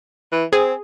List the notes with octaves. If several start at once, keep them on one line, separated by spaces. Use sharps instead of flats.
E3
C4 G#4